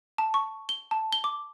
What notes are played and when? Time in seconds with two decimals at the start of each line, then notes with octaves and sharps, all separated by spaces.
0.18 A5
0.34 C#6
0.69 G7
0.91 A5
1.13 G7
1.24 D6